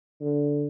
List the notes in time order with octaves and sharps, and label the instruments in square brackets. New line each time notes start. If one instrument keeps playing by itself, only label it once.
[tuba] D3